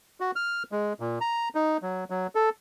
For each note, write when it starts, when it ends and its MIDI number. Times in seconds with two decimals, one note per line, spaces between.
0.20 0.31 66
0.36 0.63 89
0.72 0.93 56
1.00 1.19 46
1.21 1.49 82
1.55 1.77 63
1.82 2.04 54
2.10 2.27 54
2.35 2.49 69